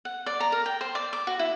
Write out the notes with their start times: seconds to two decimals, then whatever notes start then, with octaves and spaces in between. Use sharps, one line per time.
0.05 F#5
0.26 D5
0.40 A#5
0.52 A#4
0.66 G5
0.81 C5
0.95 D5
1.13 D6
1.27 F#4
1.39 E4